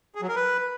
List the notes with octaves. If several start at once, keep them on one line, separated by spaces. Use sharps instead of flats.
G#4
F#3
A#4
B4